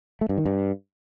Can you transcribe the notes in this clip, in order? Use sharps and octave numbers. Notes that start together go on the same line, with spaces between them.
A3
G2
D#3
G2